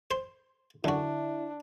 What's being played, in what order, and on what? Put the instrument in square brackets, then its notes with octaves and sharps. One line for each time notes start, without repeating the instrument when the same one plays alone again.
[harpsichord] C5 C6
[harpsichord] F#2 F#4 [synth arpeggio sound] D3 [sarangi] D4 [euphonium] E4